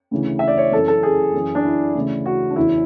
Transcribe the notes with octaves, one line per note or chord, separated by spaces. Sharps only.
D2 C#3 E3
E5
D5
C#5
F#2 E3 A4
A4
G#4
F#2 E3
D4
E4
D2 C#3 E3
F#4
D4
E2 C#3 E3 E4